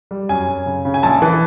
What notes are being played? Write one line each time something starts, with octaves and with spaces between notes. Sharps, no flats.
G3
F#2 G#5
F#2
C#3
C#3
G#5
A#1 A5
E3